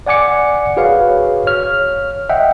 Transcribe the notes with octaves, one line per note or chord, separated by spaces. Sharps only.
D5 F#5 G#5 D6 C#7
F#4 G#4 B4 C#5 F5
C#5 F6
D#5 E5 F#5 G5